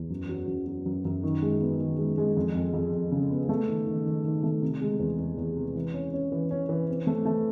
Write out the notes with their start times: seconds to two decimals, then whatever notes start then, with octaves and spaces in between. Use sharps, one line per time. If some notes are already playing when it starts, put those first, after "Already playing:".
Already playing: E2
0.10 F#2
0.29 F#3
0.47 F#2
0.66 F#3
0.86 F#2
1.05 F#2
1.23 D#3
1.42 G#3
1.61 B3
1.80 D#3
1.99 G#3
2.18 G#3
2.37 F2
2.55 F2
2.74 F2
2.92 F2
3.12 C#3
3.31 B3
3.49 A3
3.68 D#3
3.87 D#3
4.06 D#3
4.24 D#3
4.43 A3
4.62 C3
4.81 G#3
5.00 E2
5.19 E2
5.38 E2
5.56 C3
5.75 E3
5.94 C#4
6.13 C#4
6.32 E3
6.51 C#4
6.69 E3
6.88 C4
7.07 A3
7.26 A3